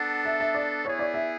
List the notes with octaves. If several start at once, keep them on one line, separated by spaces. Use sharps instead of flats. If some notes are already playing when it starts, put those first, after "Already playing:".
Already playing: B3 D4 A4 F#5
E5
E5
D5
B3 E4 G#4 C#5
D5
E5